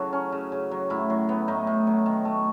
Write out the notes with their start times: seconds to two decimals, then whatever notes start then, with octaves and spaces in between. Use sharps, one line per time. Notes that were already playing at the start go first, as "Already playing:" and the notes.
Already playing: C#3 F#3 E4 F#4 A4
0.13 C#4
0.32 C#3
0.52 C#3
0.71 F#3
0.90 A2 E4
1.10 F#3
1.29 B3
1.48 A2 D#4
1.67 A2
1.87 F#3
2.06 D#3
2.25 A3